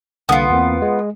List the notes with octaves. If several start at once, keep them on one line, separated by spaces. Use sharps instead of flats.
C2 D3 A#3 B3 F4
E2 A#3 C4
G#3